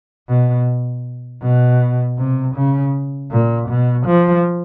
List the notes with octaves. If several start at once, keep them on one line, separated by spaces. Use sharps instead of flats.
B2
B2
C3
C#3
A#2
B2
F3